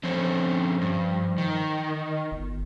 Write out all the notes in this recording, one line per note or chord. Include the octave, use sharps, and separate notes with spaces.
D3 F3 C4 C#4
G2
D#3
G1